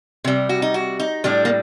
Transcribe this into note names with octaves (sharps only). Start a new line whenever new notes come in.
C3 G3
F#4
D#4
F#4
D#4
A2 G3 D4
A#3